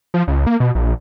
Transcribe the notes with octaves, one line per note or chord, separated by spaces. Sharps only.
F3
C#2
A#3
B2
A#1